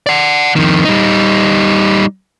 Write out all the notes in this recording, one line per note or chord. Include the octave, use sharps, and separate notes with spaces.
D5 F#5
F2 D#3
G3 D#4